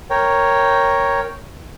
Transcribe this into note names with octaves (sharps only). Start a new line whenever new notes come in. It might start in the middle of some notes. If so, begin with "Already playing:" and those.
A#4 C#5 G5